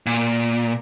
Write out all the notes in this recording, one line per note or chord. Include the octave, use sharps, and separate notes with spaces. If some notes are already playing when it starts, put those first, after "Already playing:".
A#2